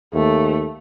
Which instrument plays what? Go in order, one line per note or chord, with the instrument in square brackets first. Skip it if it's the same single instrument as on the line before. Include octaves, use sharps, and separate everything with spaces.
[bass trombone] D#2 [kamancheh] A3